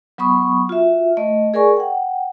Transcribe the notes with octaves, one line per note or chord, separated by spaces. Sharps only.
F#3 B3 B5 C#6 D#6
F4 F#4 E5
A3 D#5
G#4 A#4 D5 G#5 C#6
F#5 G5